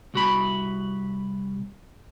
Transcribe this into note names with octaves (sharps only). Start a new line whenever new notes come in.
C2 F#4 B5